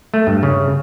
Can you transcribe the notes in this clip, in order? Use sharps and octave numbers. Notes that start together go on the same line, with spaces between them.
A3
G2
C#3